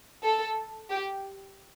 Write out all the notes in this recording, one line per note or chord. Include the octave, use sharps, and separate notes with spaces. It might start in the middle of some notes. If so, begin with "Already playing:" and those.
A4
G4